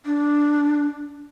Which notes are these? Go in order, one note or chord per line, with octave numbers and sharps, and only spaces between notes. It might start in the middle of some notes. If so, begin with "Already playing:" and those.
D4